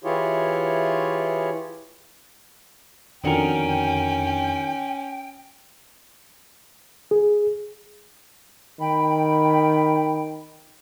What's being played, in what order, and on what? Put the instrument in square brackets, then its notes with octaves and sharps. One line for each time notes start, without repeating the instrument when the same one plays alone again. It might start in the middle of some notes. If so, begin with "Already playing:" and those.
[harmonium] E3 E4 F4 G4 G#4 C#5
[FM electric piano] F2 D3 [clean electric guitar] D#3 F#4 A#4 [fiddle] C#4 [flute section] G5
[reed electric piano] G#4
[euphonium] D#3 [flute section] G5 B5